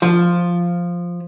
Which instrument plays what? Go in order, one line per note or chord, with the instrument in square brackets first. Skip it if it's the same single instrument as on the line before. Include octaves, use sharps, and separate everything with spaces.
[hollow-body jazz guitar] F3